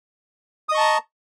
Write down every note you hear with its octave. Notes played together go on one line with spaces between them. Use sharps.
D#5 A5 A#5 C#6 D#6